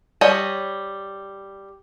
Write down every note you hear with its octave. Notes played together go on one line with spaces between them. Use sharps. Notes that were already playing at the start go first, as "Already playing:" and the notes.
G3 C#5 D#5